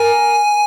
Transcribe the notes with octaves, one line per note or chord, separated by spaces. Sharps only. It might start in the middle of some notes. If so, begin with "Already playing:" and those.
Already playing: A#4 G#5